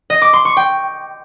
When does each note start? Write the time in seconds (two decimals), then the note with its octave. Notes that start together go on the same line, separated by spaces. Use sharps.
0.10 D#5
0.22 D6
0.33 C6
0.45 C#6
0.57 G5